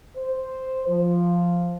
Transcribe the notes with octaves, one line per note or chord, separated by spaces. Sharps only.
C5
F3